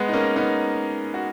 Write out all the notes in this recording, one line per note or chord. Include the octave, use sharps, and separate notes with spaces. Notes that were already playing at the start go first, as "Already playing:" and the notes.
Already playing: G#3 B3
D#4
A#3 C#4
B3 D#4
F#4